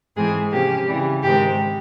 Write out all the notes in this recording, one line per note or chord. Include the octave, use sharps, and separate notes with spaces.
G#2 E3 G#3 C4 G#4
C3 F3 A#3 C#4 G4
C#3 E3 G3
G#2 D#3 G#3 C4 G4